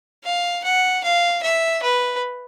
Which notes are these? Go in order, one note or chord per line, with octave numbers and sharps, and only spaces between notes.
F5
F#5
F5
E5
B4